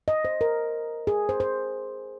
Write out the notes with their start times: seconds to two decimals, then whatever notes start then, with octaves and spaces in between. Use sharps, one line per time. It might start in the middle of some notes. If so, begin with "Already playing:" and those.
0.08 D#5
0.25 C5
0.41 A#4
1.07 G#4
1.29 C5
1.40 C5